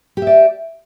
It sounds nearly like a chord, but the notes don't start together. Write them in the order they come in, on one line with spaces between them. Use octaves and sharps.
G4 E5 D5